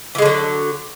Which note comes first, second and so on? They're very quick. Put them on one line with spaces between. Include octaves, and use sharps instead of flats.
E3 G#3 D3 F#3